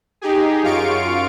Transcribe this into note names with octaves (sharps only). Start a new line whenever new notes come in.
D#4 G4 G#4
F#2 F4 F5 C#6 D7